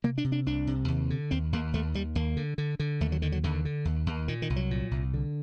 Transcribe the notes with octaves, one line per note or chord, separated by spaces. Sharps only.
C3 A#3
D4
C3
D4
C2 D4
C3
D#2
D3
D#2 C4
D#2 A#3
D#2 A3
D#2 G3
D#2 A#3
D3
D3
D3
D#2 A3
F#3
D3 D#3
F#3
D#2 D3
D3
D#2
D#2
A#2 D#3
D#3
C2
F#3
A#2
C2
D3